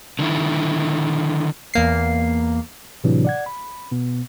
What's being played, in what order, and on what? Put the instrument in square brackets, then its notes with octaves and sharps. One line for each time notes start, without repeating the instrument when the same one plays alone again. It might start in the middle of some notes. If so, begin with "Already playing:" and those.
[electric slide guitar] D3 D#3 E4
[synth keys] E2 A#3 C7
[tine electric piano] A2 C3 E3 F#3 D4
D5 F#5 G#6
B5
B2 B3